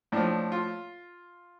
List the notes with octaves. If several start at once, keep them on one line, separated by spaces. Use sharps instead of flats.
A2 F3 D4
F4